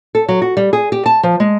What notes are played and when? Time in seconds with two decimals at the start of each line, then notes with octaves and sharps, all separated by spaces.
0.15 A4
0.28 F#3
0.42 F#4
0.57 G3
0.73 G#4
0.92 G4
1.06 A5
1.23 F3
1.40 G#3